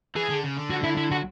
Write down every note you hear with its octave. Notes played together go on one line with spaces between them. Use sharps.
E3 G#4
D3
C#3
D3
F#4
E4
E4
F#4